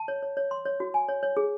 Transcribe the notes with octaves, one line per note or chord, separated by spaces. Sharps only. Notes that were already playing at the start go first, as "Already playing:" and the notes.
Already playing: A5
C#5
C#5
C#5
C6
C#5
F#4
G#5
C#5
C#5
G#4